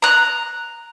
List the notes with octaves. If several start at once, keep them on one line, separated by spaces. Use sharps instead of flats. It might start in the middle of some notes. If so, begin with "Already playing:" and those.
A#5 F#6